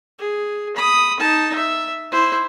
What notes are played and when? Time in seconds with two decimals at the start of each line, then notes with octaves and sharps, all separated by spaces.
0.19 G#4
0.77 B5 D#6
1.20 D#4 A5
1.56 E5
2.12 E4 C5